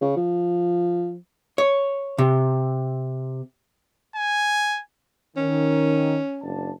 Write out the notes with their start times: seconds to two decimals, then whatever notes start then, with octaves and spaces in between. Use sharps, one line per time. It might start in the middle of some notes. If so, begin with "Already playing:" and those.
0.01 C#3
0.16 F3
1.58 C#5
2.18 C3
4.16 G#5
5.37 D#3 C#4
6.42 F#1 D4 A5